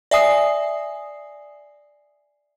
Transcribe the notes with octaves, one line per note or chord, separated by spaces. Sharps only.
D5 E5 G#5 D#6 C7